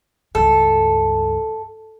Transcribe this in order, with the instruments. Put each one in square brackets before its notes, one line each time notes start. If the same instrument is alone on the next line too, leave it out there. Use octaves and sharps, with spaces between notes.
[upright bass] C#2 G2 [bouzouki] A4